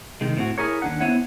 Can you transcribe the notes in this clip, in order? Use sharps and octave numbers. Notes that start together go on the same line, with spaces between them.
C3 D#3 G#3
A2 C4 F#4
E4 G#4 A#4 C#5
D#2 D4 F#5
B3 C4 E4 C#5 F#5